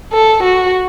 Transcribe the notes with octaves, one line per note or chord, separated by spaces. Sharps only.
A4
F#4